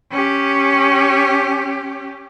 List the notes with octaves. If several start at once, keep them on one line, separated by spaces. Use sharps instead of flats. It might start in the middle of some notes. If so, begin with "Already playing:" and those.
C#4 G4